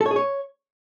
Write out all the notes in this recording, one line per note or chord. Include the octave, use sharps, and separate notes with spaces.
A4
C#5
G#4
C#5